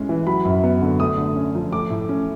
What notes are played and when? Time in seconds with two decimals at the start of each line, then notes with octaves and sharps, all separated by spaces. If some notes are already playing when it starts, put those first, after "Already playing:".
Already playing: A2 G#3 C#4
0.09 E3
0.27 F#3 B5
0.45 F#2
0.64 B3
0.82 D3
1.00 A3 D#6
1.18 D3
1.36 C#4
1.55 F3
1.72 A3 D6
1.90 A2
2.09 C#4